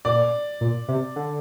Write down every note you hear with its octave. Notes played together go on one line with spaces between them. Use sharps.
A#2 D5
A#2
C3
D3